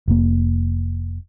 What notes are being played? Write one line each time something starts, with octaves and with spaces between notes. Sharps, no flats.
F1 A#3